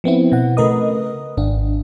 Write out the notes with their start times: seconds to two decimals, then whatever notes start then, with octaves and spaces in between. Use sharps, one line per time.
0.04 F3 B3 C4 E4
0.32 B2 F#5
0.57 C#3 A3 A#4 B4 D#5 D#6
1.37 G#1 D4